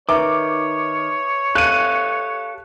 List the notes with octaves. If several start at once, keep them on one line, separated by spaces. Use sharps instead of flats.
D#3 B4 C#5 E5 A#5 D6
G4 A4 F5 F#6 D#7